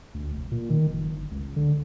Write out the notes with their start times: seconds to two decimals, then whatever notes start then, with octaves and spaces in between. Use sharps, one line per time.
0.14 D2
0.35 F1
0.51 A#2
0.70 D#3
0.87 F#1
1.12 G1
1.31 C#2
1.56 D3